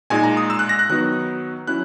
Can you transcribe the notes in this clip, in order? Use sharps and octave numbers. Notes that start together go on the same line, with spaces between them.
A#2 G#3 D#4 G#5
A#5
D#6
E6
F#6
A#6
F#6
D#3 F#3 B3 D#4 F#6
F#3 C#4 E4 F#6